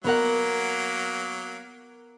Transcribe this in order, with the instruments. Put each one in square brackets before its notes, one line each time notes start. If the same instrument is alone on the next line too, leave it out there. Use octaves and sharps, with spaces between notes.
[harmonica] F#3 A#3 [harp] B3 A#4 F#5